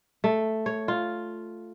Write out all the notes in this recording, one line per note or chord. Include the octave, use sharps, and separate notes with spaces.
A3
C#5
F4